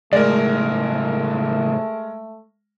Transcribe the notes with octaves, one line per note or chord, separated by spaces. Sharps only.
C#2 A2 G#3 A3 A#4 D5